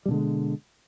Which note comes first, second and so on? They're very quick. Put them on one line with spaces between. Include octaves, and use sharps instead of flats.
G3 B2 D3 G#3